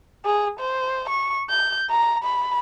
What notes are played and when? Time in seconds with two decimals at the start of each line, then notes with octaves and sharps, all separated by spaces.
0.25 G#4
0.60 C5
1.10 C#6
1.49 G6
1.90 A#5
2.24 B5